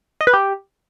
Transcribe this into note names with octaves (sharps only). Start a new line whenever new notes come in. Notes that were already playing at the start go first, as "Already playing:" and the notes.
D#5
B4
G4